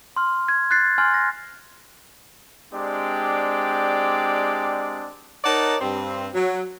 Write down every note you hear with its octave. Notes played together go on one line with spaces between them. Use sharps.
C6 F6
G#6
F#6 A6 C7
G#5 C6 F6
A#6
G#3 C4 D4 G4 D5
D#4 A#4 C#5 D5 F#5 A5
G2 C4
F#3